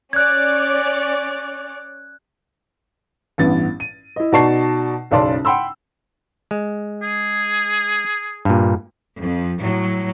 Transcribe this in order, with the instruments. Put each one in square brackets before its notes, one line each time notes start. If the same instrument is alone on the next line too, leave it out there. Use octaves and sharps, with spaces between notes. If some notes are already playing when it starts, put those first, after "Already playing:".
[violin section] C#4 C#5 D5 [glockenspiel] F#6 G#6
[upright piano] A1 G2 E3 B3 A6
D#7
E4 D#5
B2 D#4 D5 A5 C#6 C7
F#1 B1 C#3 D5 A5 C6
F#5 G5 B5 C6 E6
[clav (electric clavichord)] G#3
[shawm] G#4
[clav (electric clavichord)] G2 A#2
[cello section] F2
A2 F#3